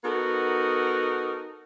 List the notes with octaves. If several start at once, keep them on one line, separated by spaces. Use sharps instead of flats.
B3 D#4 F#4 A4 A#4